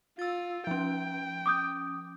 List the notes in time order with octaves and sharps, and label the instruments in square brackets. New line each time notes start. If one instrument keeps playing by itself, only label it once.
[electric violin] F4 [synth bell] E6 A6
[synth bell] F3 C#4 [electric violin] G5
[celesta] D6 D#6 G6